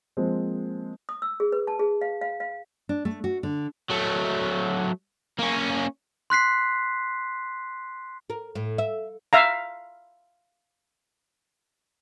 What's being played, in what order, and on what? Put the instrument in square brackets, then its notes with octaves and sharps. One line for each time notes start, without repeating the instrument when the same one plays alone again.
[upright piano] F3 G#3 A#3 C4
[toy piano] D#6
E6
G#4
B4
A5
G#4
F5
F5
F5
[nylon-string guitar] D4
A3
F#4
D3
[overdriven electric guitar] F#3 A3
A#3 C#4
[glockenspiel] C6 F#6 B6 C7
[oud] A#4
A2
E5
[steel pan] E5 F5 A#5